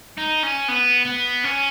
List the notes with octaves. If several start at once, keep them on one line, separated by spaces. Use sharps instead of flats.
D#4
C#4
B3
B3
C#4